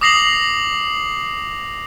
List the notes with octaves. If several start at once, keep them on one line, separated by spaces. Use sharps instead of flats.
D6 D#6 A#6 C7 F7 F#7